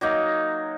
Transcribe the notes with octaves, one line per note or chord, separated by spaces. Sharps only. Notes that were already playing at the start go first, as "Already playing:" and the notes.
F#3 A#3 D#4